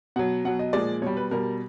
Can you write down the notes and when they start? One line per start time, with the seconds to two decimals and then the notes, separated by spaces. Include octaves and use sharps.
0.16 B2 F#3 F#5
0.45 B2 F#3 F#5
0.59 D#5
0.73 A#2 F3 G#3 D5
1.02 B2 G3 C#5
1.17 B4
1.31 B2 G3 A#4